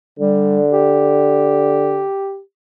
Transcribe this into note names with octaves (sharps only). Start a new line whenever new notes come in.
D3 G3
G4